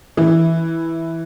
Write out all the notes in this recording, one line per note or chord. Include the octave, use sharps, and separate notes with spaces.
E3